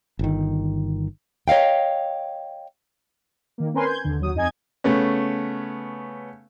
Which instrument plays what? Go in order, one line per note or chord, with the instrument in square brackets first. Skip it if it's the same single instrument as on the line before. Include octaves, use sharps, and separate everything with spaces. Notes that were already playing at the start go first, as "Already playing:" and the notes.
[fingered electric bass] G1 D#3
[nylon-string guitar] C#5 D#5 F5 G5
[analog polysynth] D#3 A#3
C4 C#4 A#4 B4 G#5 C6
G6 G#6
D#2 D3
D#2 F#3 D#6
F2 D#4 D#5 G#5 G#6
[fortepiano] C#3 A3 B3 C#4